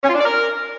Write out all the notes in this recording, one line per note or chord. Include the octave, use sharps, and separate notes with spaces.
C#4
F4
D4
D5
A#4